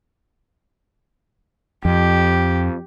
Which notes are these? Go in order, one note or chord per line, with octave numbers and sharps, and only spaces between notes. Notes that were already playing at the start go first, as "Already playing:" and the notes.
F2 G4